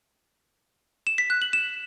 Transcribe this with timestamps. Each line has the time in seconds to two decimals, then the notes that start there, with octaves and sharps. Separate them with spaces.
1.07 E7
1.18 B6
1.30 F#6
1.42 F#7
1.53 E7